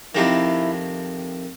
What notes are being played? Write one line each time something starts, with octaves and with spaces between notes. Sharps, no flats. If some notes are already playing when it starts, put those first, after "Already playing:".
F2 C3 D#3 E4